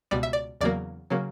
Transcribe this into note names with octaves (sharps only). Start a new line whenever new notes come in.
C#2 B2 G3 D5
E5
D5
E2 C#3 F#3 A#3 D5
C#3 F#3 A#3